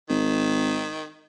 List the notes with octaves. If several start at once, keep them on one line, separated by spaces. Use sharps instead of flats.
G#1 D#3